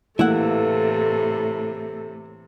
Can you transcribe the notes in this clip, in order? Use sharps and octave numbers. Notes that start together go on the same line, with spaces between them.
A2 C3 E3 A3 A#3 E4 A4 F#5